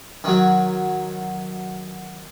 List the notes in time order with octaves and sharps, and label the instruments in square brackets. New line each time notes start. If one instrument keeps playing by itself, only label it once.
[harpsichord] D#3 F#3